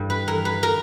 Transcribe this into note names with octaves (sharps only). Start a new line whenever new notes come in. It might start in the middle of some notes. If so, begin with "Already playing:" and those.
Already playing: G2 E3
B4
E3 A#4
B4
A#4